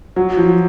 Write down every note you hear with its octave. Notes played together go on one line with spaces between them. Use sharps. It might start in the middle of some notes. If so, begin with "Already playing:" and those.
F#3
F3